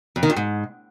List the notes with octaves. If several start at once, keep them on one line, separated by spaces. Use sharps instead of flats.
F2
D#3
F2
G#2